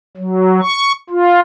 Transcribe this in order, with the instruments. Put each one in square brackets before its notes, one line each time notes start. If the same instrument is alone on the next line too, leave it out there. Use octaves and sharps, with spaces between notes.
[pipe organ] F#3
C#6
F4